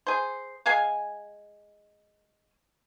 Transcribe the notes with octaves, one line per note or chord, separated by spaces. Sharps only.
G#4 C5
G#3 G#4 F5 G#5